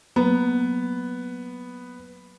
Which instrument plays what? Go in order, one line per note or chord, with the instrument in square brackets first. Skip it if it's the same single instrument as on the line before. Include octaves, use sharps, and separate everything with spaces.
[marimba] F#3 A#3 [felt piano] B3